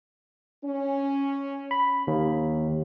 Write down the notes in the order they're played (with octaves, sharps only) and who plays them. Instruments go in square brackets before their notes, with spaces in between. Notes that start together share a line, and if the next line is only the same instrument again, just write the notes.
[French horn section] C#4
[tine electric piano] B5
D#2